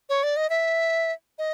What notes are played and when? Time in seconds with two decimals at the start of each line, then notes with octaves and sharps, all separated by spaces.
0.09 C#5
0.23 D5
0.37 D#5
0.50 E5
1.38 D#5